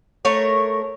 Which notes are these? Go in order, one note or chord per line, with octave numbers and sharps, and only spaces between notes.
A3 A#4 C#5